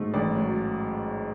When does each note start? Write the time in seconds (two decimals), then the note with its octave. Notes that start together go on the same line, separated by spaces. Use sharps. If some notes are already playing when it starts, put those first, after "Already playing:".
Already playing: G#2 F#3 A3
0.14 A1 D5
0.36 F#3